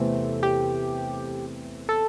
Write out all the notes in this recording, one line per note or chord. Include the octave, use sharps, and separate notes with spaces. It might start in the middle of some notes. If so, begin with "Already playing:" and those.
Already playing: E2 C3 E3 A3 C4
G4
A4